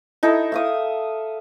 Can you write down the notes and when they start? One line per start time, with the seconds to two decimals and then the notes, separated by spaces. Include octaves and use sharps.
0.23 D#4 E4 A4 E5
0.52 E5 F5 D#6